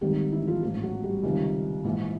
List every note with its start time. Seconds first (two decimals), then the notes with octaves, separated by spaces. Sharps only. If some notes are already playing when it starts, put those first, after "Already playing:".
0.01 G#1 G#2 D#3 G3 G4
0.32 E3 E4
0.47 F3 F4
0.62 A1 G#2 F3 F4
0.83 F#3 F#4
1.03 G3 G4
1.23 C#2 C3 D#3 G3
1.84 A#1 G#2 E3